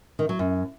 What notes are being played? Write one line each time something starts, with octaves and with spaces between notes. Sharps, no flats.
D#3
F#3
F#2